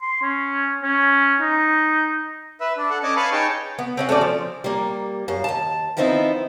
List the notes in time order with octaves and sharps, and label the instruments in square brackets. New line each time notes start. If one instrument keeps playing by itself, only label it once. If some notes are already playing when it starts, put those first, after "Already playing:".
[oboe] C6
C#4
C#4
D#4
[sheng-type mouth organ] B4 E5
D4
A4 F#5
C#4 D5 D#5 G#5 A5
B4 F5 G#5 A5 B5 C#6
D#4 G#4 C#5 G5 A5 C#6
[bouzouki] B3
C4 C#4 F#5
A3 C#4 F#4 D5
F3
[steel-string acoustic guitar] G3 A#3
F#2 F5
D#2 A5
D#3 F3 B3 C4 D#4 E4